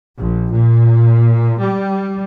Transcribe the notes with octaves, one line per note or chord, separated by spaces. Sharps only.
A#1
A#2
G3